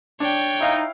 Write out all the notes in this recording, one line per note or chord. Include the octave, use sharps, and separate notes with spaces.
D4 C#5 G5
D#4 E4 F5